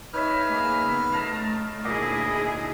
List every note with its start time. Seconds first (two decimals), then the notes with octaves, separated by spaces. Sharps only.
0.13 D#4 B4 C#5 E5 F6
0.47 A#3 G#4
0.82 C#3 B3
1.12 A3 F5 A5 A#5
1.84 D2 A#2 E4 G#4 D#5